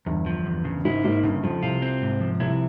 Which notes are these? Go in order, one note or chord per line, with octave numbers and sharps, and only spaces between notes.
G1 E2 G2
F3
E2
C#3
G#1 G#2 E4
G#1 G#2 A#3
G1 G2 C#3
F2 F3
C2 C3 F4
C4
G#2
F3
C2 C3 E4